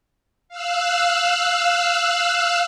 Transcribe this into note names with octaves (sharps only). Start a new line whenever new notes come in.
F5 E6 F#6